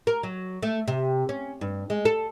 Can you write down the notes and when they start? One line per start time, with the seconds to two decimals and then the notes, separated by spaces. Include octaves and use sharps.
0.07 A#4
0.23 F#3
0.63 A3
0.88 C3
1.29 C#4
1.61 G2
1.90 G#3
2.05 A4